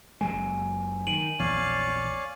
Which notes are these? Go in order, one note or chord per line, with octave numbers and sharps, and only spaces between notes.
F#1 F#3 G#3 G#5
D#3 D7 D#7 F#7
A#1 E2 C#5 D5 F5